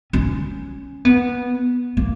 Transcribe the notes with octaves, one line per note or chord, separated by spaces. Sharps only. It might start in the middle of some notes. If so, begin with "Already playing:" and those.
C#4
B3
A#3